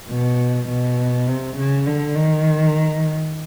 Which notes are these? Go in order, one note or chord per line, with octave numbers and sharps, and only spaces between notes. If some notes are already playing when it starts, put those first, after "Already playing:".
B2
B2
C3
C#3
D3
D#3